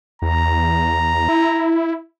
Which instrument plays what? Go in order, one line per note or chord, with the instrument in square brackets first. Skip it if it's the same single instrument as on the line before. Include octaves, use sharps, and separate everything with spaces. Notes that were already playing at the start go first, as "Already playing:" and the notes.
[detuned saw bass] E2 [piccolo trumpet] A#5
[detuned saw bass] E4